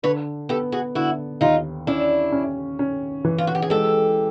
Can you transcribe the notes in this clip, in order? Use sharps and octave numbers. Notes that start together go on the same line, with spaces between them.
D3 B4 C#5
B3 G4 A4
F#4 G#4
D3 E4 F#4
D#2 D#4 F4
C#4 D4 E4
C#4
C#4
E3
F4
F#4
G4
G#4
G#3 G4 A4